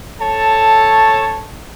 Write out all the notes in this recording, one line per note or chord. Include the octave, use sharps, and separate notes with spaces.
A4 C#5 A5